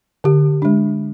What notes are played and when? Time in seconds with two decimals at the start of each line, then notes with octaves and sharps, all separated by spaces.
0.24 D3 G4
0.62 G#3 D4